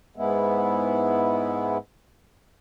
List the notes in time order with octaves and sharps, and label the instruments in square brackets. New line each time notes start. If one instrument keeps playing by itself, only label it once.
[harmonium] G#2 G#3 B3 E4